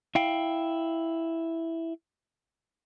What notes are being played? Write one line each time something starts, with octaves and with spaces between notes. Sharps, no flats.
E4 F5 G5